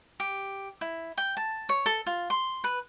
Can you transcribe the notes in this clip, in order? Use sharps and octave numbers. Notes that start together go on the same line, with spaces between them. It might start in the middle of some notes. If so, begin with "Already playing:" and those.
G4
E4
G5
A5
C#5
A4
F4
C6
B4